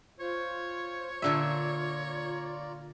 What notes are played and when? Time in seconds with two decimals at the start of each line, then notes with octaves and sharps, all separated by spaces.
0.20 F4 C5 C#5
1.22 A#2 D3 F4 D5 E5 A#5